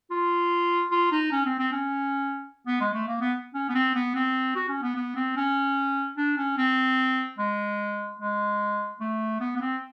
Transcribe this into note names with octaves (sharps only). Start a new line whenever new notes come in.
F4
F4
D#4
C#4
C4
C4
C#4
B3
G#3
A3
A#3
B3
C#4
B3
C4
B3
C4
F#4
C#4
B3
B3
C4
C#4
D4
C#4
C4
G#3
G#3
A3
B3
B3
C4